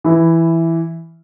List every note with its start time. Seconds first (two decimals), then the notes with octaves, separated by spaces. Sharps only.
0.04 E3 E4